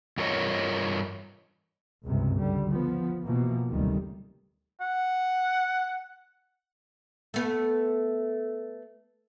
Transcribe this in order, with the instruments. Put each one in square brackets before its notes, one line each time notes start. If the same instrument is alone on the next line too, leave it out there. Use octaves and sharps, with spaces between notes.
[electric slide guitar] G2 E3 F4 A#4 C#5 D#5
[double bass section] F#1 C#2 G2 C3
D3 G3
F3 B3
B2 E3 F3 A#3
F#1 D2 C3 D#3 G3
[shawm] F#5
[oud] A3 B3